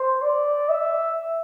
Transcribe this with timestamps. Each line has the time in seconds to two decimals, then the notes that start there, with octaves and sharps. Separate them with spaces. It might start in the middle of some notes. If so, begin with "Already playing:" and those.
Already playing: C5
0.22 D5
0.69 E5